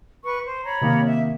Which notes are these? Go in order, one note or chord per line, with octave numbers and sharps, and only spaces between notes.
B4 C#6
C5
C#5 A#5 B5
C3 D#3 A#3
E5